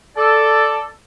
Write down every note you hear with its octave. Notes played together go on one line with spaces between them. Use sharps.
A4 D5